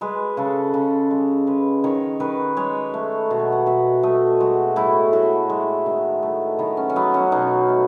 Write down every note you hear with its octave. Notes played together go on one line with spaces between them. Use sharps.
G#3 B4
C#3 A4
C#3
G#3
G#3 B4
D#3 C#5
D#3 B4
G#3 C#5
A3
B2
G#5
F#5
B2 E5
A3 D#5
G#3 F#4
A2 E4
A2 F#4
G#3
D#3 B3
A3
D#3 B3
C#4
C#4
F#3 B3
C#4
B2 D#4
A3